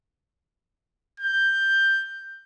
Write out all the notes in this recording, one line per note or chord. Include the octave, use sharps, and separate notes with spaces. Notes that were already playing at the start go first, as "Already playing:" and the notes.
G6